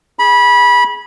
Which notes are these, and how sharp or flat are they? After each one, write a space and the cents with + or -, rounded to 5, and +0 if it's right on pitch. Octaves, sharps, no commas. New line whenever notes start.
G#4 +0 B5 -20